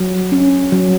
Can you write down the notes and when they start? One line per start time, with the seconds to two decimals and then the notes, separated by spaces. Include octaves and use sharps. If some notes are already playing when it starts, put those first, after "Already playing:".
Already playing: F#3
0.32 C#4
0.72 F#3